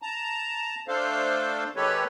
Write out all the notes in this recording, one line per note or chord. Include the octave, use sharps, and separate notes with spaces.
A5 A#5
A3 D4 A4 C5 F5
D#3 G#3 G4 A4 B4 C#5